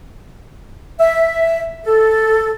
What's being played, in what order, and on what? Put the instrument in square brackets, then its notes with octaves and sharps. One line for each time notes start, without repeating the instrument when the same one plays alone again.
[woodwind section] E5
A4